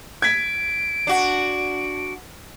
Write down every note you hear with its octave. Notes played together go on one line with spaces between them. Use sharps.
G#6 B6 D7
D4 F#4